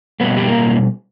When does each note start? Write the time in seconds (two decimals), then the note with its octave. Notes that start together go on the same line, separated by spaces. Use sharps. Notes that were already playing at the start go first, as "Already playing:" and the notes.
0.20 B2 G3 A#3 B3 B4
0.37 G4
0.47 A#3 A#4